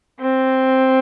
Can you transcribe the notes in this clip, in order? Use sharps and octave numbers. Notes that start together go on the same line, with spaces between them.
C4